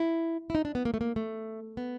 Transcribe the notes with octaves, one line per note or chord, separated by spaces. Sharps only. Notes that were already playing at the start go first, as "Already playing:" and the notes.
Already playing: E4
E4
D#4
D4
B3
A#3
A3
A#3
A3
B3